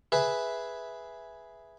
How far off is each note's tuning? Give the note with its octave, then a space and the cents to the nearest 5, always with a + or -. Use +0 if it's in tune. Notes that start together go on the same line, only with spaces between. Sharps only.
G#4 +0 B4 +0 E5 +0